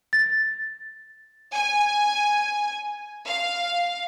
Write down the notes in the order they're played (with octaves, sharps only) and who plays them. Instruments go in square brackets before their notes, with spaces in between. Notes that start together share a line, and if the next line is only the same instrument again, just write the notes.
[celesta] A6
[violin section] G#5
F5